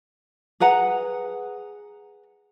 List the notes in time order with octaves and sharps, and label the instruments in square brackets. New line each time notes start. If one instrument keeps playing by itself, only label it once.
[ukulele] G#4 B4 F#5 A#5